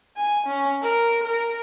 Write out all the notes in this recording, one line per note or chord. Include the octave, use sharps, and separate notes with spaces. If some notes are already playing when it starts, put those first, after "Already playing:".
G#5
C#4
A#4
A#4